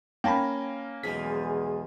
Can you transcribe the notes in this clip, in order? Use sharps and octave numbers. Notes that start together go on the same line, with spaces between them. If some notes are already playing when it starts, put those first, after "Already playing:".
A#3 C#4 G5 A5 B5
B1 E2 F3 G#3 G#4 B6